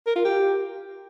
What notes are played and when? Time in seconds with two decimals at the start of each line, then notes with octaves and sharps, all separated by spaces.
0.06 A#4
0.15 F4
0.24 G4